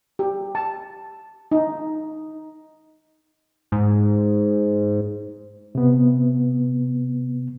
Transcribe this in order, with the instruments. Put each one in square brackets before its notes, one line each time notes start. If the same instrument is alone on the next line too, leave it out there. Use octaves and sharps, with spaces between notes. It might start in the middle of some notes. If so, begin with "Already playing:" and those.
[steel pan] G4
A5
D#4
[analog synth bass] G#2
[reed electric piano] C3 B3